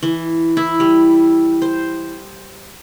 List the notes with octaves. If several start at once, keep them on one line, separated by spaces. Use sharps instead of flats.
E3
E4
G3
C5